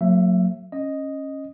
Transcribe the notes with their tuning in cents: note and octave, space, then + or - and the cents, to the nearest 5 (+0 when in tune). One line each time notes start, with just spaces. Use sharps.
F#3 -20 A#3 -40 E5 +15
C#4 -20 D#5 +0